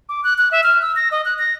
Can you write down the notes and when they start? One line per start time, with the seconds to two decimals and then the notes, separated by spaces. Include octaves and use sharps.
0.09 D6
0.24 F#6
0.38 F#6
0.51 E5
0.63 F6
0.82 E6
0.96 A#6
1.11 D#5
1.25 F#6
1.39 A#6